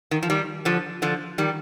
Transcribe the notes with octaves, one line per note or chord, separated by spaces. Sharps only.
D#3
F3
D#3 G3
D3 F3
D3 F3
D#3 G3